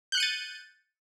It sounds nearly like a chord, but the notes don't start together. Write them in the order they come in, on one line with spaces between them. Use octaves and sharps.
G6 F#6 C#7 D#7 A6